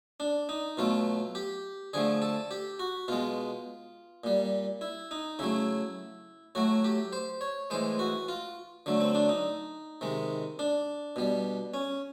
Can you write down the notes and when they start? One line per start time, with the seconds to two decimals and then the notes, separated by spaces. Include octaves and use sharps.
0.20 D4
0.49 D#4
0.77 B2 F#3 A3 F4
1.35 G4
1.93 D3 F3 A3 G#4
2.22 A4
2.51 G4
2.79 F#4
3.08 B2 G#3 F4
4.24 A#2 G3
4.81 E4
5.11 D#4
5.39 C#3 F#3 A3 E4
6.55 A2 F#3 A3 F#4
6.84 G4
7.13 C5
7.41 C#5
7.70 A2 E3 G#3 C5
7.99 F#4
8.28 F4
8.86 D3 F#3 A3
9.01 C4
9.15 D4
9.29 D#4
10.01 C3 D#3 G#3
10.59 D4
11.16 B2 G3
11.74 C#4